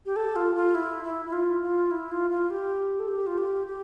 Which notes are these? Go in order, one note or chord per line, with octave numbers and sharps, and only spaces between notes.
G4
A4
F4
F4
E4
E4
E4
F4
F4
E4
F4
F4
G4
A4
G4
F4
G4
G4